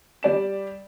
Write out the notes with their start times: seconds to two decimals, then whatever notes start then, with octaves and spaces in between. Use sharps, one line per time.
0.23 G3 D5 E7